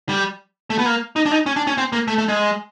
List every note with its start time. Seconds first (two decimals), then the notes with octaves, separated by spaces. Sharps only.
0.09 G3
0.70 A3
0.79 B3
0.86 A#3
1.16 D#4
1.26 D4
1.32 D#4
1.46 C#4
1.56 D4
1.67 C#4
1.78 C4
1.93 A#3
2.08 A3
2.18 A3
2.28 G#3